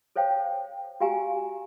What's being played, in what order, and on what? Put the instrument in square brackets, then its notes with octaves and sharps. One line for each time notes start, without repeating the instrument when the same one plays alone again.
[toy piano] A4 C5 C#5 F5 G5
F#4 G4 F5 G#5 A#5